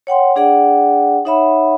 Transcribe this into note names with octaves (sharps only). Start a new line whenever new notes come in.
C#5 F#5 G5 C6
D4 G#4 D5 F#5 G5
D#4 C#5 E5 F#5 B5